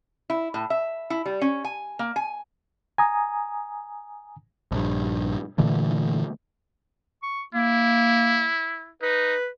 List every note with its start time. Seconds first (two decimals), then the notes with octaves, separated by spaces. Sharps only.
0.30 E4
0.54 A2
0.70 E5
1.10 E4
1.26 G3
1.41 C#4
1.64 G#5
1.99 A#3
2.16 G#5
2.98 G#5 A#5 D#6
4.72 A#1 G2
5.58 A#2 D3 E3 A3
7.23 C#6
7.54 A#3 E4
9.02 D#4 B4